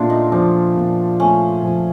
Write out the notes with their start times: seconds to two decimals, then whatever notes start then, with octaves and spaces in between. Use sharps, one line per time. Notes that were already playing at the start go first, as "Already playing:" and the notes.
Already playing: A#2 A3 D4 F4
0.10 D#4
0.32 F3 D4
0.75 A#2
1.20 A3 C#4
1.63 F3